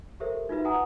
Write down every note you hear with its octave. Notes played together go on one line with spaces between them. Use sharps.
G4 A4 A#4 C5 E5
D#4 F4 F#4 B4 E5
F4 B4 F#5 G#5 A#5 D#6